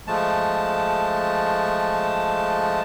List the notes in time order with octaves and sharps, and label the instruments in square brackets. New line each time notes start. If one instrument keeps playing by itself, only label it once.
[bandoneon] F3 G#3 A3 A5